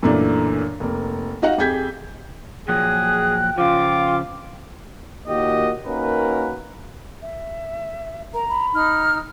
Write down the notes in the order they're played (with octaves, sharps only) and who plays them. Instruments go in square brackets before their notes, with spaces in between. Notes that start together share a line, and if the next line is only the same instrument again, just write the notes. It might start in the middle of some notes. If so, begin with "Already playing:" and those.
[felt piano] F#2 A#2 E3 A3 A#3 D4
F1 A#3
D#4 F#4 D#5 F5 F#5
F2 G4 G#4 G6 G#6 B6
[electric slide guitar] A#2 F3 F#3 [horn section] G#4 [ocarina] G5 [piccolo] F#6
[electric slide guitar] C#3 F3 [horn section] F4 [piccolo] D6
[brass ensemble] D#2 A#2 A#3 F#4 G4 D#5
A#3 C#4 D#4 F#4 A#4 B4
[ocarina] E5
[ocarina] A#4 [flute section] A#5
[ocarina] B5
[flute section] D#4 F6